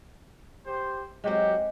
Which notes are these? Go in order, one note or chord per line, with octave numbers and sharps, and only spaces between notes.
G4 C5
F#3 G#3 C4 F#4 G4